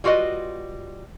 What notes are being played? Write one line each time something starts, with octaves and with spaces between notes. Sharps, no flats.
G3 F4 F#4 B4 D#5